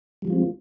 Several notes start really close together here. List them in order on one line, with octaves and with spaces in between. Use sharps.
G3 F3 G#3 F4 C4